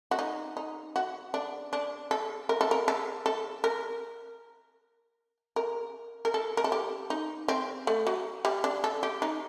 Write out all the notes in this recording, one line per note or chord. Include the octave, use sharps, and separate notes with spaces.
F#4
D#4
D#4
F#4
D4
D4
A4
A#4
A4
A#4
A4
A4
A#4
A#4
A#4
A4
A#4
A4
G4
D#4
C4
A3
F#3
G3
D4
A4
G4
D#4